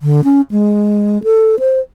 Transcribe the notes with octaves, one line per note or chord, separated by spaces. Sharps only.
D3
C#4
G#3
A4
C5